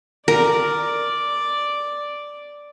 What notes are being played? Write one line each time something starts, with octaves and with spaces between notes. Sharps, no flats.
A#4 D5